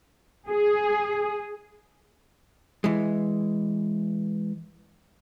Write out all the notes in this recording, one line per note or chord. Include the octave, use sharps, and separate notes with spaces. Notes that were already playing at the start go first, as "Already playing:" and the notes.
G#4
E3 G#3